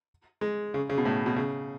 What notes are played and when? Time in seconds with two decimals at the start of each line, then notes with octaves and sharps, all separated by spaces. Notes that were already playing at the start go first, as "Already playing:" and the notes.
0.41 G#3
0.74 C#3
0.90 C#3
0.98 B2
1.05 A2
1.26 B2
1.36 C#3